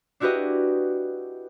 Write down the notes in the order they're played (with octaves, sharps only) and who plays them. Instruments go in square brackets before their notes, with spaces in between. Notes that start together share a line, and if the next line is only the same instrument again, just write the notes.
[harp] D4 E4 F#4 G4 B4 D#5